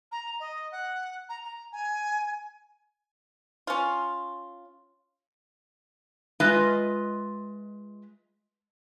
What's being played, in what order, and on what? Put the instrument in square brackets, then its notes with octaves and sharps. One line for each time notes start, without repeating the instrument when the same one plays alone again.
[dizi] A#5
D#5
F#5
A#5
A#5
G#5
[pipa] C#4 F4
[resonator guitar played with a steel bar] G#3 F4 B4 D#5 E5